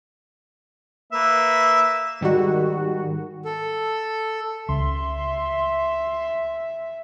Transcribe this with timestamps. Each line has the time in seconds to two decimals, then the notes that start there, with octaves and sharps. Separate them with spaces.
1.13 A#3 B4 E5
2.21 G#2 D#3 G3 F#4
3.45 A4
4.69 C#2 E5 C6